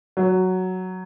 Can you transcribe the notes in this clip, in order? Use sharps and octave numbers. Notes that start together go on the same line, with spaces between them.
F#3